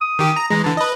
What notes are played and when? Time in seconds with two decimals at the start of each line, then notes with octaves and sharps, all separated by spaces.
0.01 D#6
0.19 D#3 G4
0.36 A#5
0.50 E3 G#3 A#5
0.64 D3 E3 A5
0.77 B4 D#5